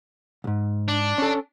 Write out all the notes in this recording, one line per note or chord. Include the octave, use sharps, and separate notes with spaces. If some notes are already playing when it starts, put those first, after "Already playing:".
C2 G#2
D4
C#4 A4